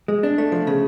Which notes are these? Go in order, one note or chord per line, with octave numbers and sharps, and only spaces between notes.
G#3
D4
A3
F3
C#3